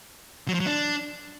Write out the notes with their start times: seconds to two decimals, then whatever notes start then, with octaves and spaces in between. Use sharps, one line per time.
0.48 F#3
0.54 F3
0.60 F#3
0.66 D4